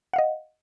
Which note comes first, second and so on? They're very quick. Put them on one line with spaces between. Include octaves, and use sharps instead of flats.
F#5 F5 D#5